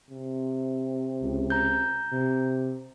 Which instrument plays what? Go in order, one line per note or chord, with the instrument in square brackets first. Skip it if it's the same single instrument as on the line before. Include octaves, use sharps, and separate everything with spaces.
[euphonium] C3
[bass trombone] C#2
[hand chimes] A#5 G6
[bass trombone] C3